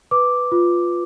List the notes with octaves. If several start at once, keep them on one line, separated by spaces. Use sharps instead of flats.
B4 D6
F4